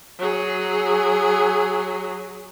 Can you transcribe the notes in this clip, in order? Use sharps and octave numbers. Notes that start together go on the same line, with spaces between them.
F#3 G#4